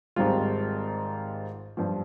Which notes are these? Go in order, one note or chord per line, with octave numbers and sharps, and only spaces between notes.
G#1 G#2 G3 C4 F4
G2 F3